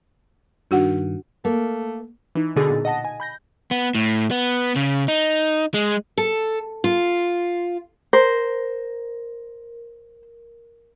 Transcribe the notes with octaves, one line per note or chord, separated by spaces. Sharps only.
G2 D#3 D4 F#4 F#5
A3 A#3
E3 D#4
B2 D3 D#4 G#4 E6 A6
A#2
D#5 F#5 A5 A#6
G#5
B5 G6 A#6
B3
A2
B3
C#3
D#4
G#3
A4
F4
A#4 C5